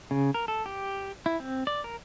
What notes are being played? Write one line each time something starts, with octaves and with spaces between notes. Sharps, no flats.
C#3
A#4
A4
G4
E4
C4
D5
A#4